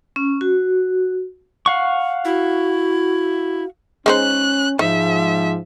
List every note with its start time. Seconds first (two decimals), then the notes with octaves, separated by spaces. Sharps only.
0.16 C#4
0.41 F#4
1.66 F5 F#5 C#6
2.25 E4 F#4
4.06 G#3 C#4 D#4 C5 F#6
4.79 G#2 F3 D#4 E5